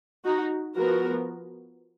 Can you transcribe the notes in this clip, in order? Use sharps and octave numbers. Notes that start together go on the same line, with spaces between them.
D#4 F#4
F3 B3 F#4 A#4